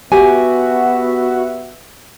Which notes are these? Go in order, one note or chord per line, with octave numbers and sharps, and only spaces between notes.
B3 F#4 G4 E5 G#5